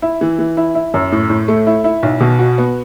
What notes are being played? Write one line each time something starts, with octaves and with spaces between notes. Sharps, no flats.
E4
E3
E3
E4
E4
F#2
A2
A2
A3
E4
E4
B1
B2
F#4
B3